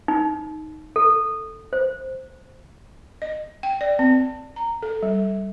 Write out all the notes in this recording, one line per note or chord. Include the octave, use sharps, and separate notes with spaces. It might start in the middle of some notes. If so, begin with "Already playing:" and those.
D#4
A4
C5
D#5
G5
D5
C4
A#5
A4
G3